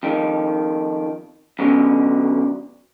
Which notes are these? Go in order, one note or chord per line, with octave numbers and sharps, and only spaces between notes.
F2 D#3
F#2 B2 D3